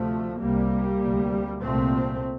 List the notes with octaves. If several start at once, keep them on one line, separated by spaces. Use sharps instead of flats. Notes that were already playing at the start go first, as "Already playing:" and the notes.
Already playing: D2 C3 F3 A3
C2 C3 G3 A#3
D2 C3
C2 A#2 A3 C4